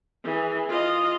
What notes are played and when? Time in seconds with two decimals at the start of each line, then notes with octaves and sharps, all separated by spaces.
0.24 E3 G#4
0.69 F4 D#5